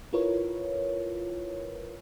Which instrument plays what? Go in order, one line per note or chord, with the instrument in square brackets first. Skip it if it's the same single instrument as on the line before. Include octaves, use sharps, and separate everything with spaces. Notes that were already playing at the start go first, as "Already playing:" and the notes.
[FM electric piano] E4 F4 A#4 B4 C#5